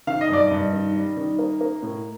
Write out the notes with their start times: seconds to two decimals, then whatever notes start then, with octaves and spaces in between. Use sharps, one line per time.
0.07 D#3 F5
0.21 D#5
0.29 G2 D5
0.47 G2 D#5
0.73 D#3
0.95 G3
1.17 D#3
1.39 A#3
1.61 A#3
1.83 A2